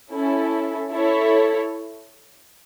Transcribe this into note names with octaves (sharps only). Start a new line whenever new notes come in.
C#4 E4 A4
E4 A4 C#5